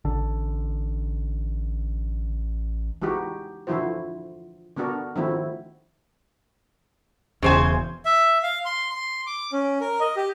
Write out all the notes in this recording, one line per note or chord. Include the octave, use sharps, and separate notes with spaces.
A1 D3
E3 G#3 D#4 F#4 G4
D3 E3 F3 E4 F#4 C5
D3 B3 D4 F#4 A#4
D#3 F3 A3 C4 E4 F#4
E1 E2 C#3 C5 G#5
E5
F5
C6
C6
D6
C#4
A#4
D#5
G4